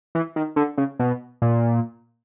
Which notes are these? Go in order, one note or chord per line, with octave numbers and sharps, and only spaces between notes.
E3
D#3
D3
C#3
B2
A#2